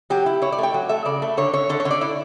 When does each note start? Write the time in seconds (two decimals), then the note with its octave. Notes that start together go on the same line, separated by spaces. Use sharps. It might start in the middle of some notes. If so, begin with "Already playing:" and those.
0.10 F#3 G4
0.26 E4
0.42 E4 C#5
0.52 D5
0.58 A3 G5
0.74 F#3
0.89 A3 E5
1.05 C#3 D5
1.22 A3
1.37 D3 C#5
1.53 D3 C#5
1.69 D3 A4
1.80 C#5
1.85 D3
1.91 D5
2.01 E4 D5